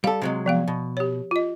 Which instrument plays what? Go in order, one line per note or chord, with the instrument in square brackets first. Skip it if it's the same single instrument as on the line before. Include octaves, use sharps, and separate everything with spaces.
[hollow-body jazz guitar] G3 A4 [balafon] F5
[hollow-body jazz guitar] C3 F#3 G#3
[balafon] F3 B3 F5
[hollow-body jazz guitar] B2
[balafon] G4 C#5
F4 D#5